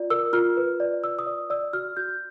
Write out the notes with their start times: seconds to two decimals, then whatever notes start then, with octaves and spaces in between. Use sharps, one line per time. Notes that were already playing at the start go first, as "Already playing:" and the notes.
Already playing: F4 D5
0.10 A#4 E6
0.33 F4 F6
0.57 B4
0.80 D5
1.04 D5 E6
1.19 D#6
1.27 D5
1.50 D5 E6
1.73 F#4 F6
1.97 F#4 G6